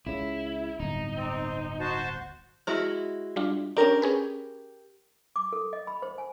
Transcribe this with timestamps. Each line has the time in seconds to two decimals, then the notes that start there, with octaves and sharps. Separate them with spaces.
0.06 C#2 C#3 E4
0.80 D1 G1 D#4
1.16 C4
1.80 F#4 C5 A5
2.67 G#3 E4 F#4 F6
3.36 G3 D4 F4
3.77 C#4 D4 G4 A#4
4.02 C#4 G#4 B4
5.36 D6
5.53 A4
5.73 D#5
5.87 B5
6.02 C5
6.18 G#5